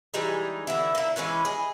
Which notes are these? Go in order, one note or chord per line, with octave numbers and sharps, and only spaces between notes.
E3 G3 G#3 D#4
D3 E3 E4
A#3 E4
E3 G#3 C#4 B4
G#4 D#5